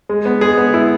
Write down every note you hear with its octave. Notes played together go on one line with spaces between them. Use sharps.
G#3
B3
G#3 G#4
B3
E4